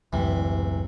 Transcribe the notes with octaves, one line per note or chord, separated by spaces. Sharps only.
F#1 C#2 F#2 A2 C3 E3